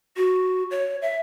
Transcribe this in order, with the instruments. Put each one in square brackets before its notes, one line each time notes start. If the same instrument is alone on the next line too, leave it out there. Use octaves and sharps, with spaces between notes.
[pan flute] F#4
C#5
E5